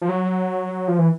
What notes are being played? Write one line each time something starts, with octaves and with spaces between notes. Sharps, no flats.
F3
F#3
F3
E3